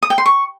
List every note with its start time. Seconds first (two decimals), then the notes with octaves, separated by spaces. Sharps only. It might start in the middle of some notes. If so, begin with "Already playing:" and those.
0.03 D#6
0.10 G5
0.18 C6
0.26 C#6